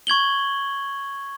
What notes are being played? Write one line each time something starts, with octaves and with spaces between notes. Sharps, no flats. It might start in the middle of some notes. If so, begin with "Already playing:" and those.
C#6 G#6 F#7 G7